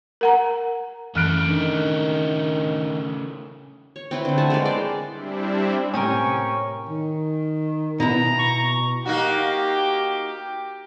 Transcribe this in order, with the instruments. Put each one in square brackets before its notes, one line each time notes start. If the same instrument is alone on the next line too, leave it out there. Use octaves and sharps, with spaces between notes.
[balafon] A#4 F#5 A#5
[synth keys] F#2 E3 [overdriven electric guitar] C#3 A3 [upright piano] F6 F#6 D7
[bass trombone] D#3 [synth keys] D4
[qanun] C#5
C4 E4 B4
D3 A3
A3 F#5 G#5 A5
G#3 A#4 B4 D5
B4 C5 D5
[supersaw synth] G3 C4 D4 E4
[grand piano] A2 C3 [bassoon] C#4 [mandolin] A#4 G5 D#6 [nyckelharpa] C#5 C#6
[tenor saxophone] D#3
[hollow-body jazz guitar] B2 E4 [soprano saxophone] A#5
[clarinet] C#6
[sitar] A#3 D#4 F#4 [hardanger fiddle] G4